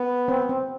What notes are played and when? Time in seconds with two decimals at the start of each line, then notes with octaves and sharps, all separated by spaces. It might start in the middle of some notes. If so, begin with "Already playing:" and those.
Already playing: B3
0.28 C4
0.49 C4